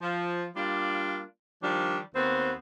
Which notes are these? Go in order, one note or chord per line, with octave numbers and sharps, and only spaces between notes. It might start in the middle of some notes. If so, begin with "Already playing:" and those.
F3
G3 A#3 D4 F4
D#3 F3 G3 D4
D#2 B3 C4